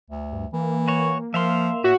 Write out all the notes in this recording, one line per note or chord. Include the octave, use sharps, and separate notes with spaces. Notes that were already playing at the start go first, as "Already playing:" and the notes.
D2
G2
E3 A#3
F#4 C#5
F3 E5 F5 C6
A2 F#4 C#5 E5